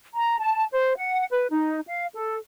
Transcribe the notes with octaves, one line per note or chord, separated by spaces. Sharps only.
A#5
A5
C5
F#5
B4
D#4
F5
A4